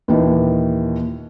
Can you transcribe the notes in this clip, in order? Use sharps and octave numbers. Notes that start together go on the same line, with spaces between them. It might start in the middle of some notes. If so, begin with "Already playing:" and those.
D#2 A#2 D#3 E3